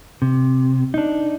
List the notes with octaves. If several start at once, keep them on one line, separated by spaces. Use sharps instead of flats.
C3
D4 D#4